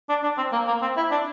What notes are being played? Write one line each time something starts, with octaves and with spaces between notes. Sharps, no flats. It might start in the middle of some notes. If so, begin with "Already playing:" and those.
D4
D4
C4
A#3
A#3
C4
E4
D4